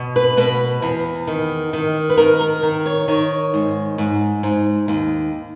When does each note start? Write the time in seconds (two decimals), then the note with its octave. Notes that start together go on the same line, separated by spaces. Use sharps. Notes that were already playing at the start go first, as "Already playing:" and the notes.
Already playing: B2
0.16 B4
0.37 B2 B4
0.82 E2
1.27 D#3
1.73 D#3
2.10 B4
2.17 D#3 A#4
2.41 A#4
2.63 D#3
2.86 C#5
3.08 D#3 C#5
3.54 G#2
3.98 G#2
4.43 G#2
4.88 D#2